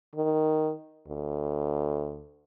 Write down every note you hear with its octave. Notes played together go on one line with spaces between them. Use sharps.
D#3
D2